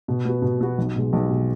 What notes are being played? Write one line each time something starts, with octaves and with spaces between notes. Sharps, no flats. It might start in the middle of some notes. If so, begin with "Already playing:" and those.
B2
B3 F#4
B2
B3 F#4
B1
B2 G#3
B1
B2 G#3